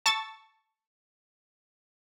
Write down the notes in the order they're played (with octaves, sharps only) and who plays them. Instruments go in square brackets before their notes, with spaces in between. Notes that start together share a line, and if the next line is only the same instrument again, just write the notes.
[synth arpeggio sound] A5 C#6 E6 A6